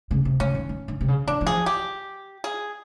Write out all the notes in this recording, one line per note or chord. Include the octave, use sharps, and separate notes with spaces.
C#3
C3
C#3 C#4
D#3
D#3
D3
C3
C#3
E3 D4
E3
F3 G#4
G4
G#4